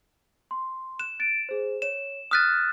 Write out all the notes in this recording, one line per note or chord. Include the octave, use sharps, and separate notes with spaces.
C6
F#6 E7
A6 D7
G#4 C5
C#5 E7
D#6 F6 F#6 A6 B6 D#7